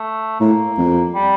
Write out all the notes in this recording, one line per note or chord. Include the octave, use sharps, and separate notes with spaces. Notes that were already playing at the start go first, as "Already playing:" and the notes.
Already playing: A3
A2 A#3
F2
G3